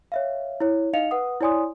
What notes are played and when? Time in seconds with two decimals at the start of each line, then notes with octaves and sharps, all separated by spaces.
0.12 C#5 E5 F5
0.60 E4 C#5
0.93 D#4 D#5 F5 C#7 F7
1.11 B4 F#5 D#6
1.41 E4 C#5 D5 G#5 C6 D#6